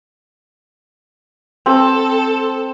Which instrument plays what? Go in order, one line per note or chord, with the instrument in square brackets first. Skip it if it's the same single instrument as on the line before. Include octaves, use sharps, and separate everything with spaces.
[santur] C4 [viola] A4